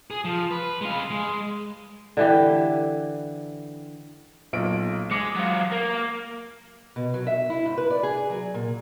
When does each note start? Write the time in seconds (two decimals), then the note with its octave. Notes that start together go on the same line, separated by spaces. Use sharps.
0.11 G#4
0.25 F3
0.51 B4
0.81 G#3 F5
1.10 G#3
2.17 D3 E3 G4
4.53 B1 A#2 D7
5.11 G#3 D6 C#7
5.36 F#3 F4
5.72 A#3
6.96 B2
7.14 F#3
7.27 E5
7.50 E4
7.66 G#2
7.78 B4
7.90 D5
8.03 G#4
8.30 F#3
8.54 A#2